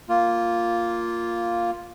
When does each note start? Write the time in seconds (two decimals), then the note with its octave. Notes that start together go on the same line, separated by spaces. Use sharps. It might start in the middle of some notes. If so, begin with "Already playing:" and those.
0.09 A#3 F4